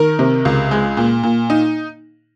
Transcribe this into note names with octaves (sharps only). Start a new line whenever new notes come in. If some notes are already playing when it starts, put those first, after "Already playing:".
Already playing: D#3 A#4
C3
C#2
G#3
A#2
A#2
D#4